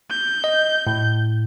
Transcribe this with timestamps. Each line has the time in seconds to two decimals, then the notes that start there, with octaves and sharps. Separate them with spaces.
0.11 G6
0.44 D#5
0.87 A2